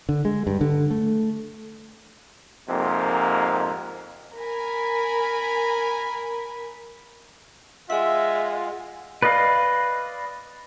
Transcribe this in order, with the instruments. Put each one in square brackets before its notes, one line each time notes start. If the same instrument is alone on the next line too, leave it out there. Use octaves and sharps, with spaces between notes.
[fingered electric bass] D3
G#3
G2
D3
A3
[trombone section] F2 G#2 C3 A#3
[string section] A#4 G#5 B5
[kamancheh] G#3 [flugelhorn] F4 [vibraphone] G#4 F#5 [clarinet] E5
[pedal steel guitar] B4 D5 D#5 F5